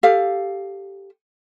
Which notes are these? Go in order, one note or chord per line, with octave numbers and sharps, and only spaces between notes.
G4 A4 F5